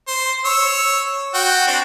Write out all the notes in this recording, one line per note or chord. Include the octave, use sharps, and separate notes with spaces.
C5
C#5 E6
F#4 G5
C4 D4 F#4